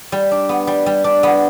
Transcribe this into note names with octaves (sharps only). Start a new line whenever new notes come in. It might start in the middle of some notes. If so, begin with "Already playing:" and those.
G3
D4
B3
G3
G3
D4
B3